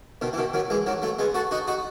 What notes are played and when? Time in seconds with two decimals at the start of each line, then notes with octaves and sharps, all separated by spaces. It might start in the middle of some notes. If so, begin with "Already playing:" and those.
0.21 B2 D#3
0.33 E3
0.37 B2 D#3
0.53 D#3 F#3
0.70 E3 G#3
0.86 D#3 F#3
1.02 F#3 A3
1.19 G#3 B3
1.34 F#4 A4
1.51 D#4 F#4
1.67 D#4 F#4